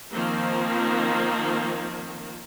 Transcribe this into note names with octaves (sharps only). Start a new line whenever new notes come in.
D#3 F3 A#3 C4